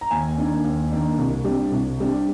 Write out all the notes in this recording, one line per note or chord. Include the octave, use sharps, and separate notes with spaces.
A#5
D#2 G#5
D#3 A#3 D4
D#2
D#3 A#3 D4
C2
C3 G3 D4
C2
C3 G3 D4